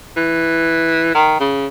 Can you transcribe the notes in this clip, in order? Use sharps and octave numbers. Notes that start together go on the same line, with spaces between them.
E3
D#3
C#3